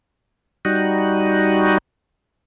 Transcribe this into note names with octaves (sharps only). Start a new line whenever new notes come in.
G3 D#4 F#4